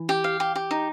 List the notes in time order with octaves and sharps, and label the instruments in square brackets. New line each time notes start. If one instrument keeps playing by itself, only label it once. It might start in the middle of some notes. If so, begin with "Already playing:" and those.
Already playing: [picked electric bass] E3
[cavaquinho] G4
F5
G4
G4
D#4